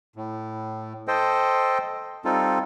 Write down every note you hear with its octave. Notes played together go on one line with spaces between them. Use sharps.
A2
A4 C5 D#5 G5
G3 C4 D#4 F4 A4